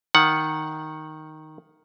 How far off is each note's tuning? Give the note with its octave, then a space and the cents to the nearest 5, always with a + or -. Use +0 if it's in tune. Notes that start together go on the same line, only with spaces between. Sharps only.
D#3 +0 F#5 +0